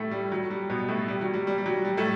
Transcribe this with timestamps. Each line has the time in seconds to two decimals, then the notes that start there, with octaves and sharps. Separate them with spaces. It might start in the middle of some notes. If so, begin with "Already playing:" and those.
Already playing: A2 G3 A3
0.11 G3
0.32 F#3
0.50 G3
0.70 B2 B3
0.88 A2 A3
1.08 G3
1.21 F#3
1.34 G3
1.47 G3
1.58 G3
1.66 F#3
1.85 G3
1.97 A2 A3